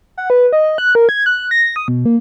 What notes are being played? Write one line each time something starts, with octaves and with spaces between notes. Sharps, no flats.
F#5
B4
D#5
F#6
A#4
G#6
F#6
A#6
D#6
B2
A#3